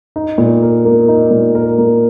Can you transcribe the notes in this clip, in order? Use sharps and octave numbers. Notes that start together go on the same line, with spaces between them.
D#4
A#2
A#4
A#3
D#4
A#2
A#4
A#3